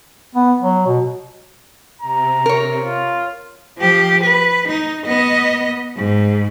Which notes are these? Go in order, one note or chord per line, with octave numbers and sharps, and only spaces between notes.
B3
F#3
B2
C3 A#5
A#4 C#5
F4
F3 G4
B4
D#4
B3 D#5
G#2